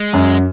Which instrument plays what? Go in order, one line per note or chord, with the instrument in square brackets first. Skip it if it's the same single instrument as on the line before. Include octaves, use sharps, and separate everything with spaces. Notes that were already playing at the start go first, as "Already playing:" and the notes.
Already playing: [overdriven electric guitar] G#3
[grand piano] F#2